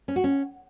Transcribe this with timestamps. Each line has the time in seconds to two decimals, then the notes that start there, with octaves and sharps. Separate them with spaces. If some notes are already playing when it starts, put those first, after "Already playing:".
0.08 C#4
0.16 F#4
0.24 C#4